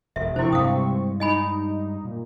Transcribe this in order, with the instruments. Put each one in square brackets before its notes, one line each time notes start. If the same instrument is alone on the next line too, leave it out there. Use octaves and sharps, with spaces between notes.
[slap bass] E1 [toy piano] E5
[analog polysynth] C3 C4 C#6 [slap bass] F3 D4 [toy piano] E4 C5
[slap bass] G2 G3 G#3 [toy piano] F5 D#6
[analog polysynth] D#4 [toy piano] D#5 G#5 B5
[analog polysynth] A#2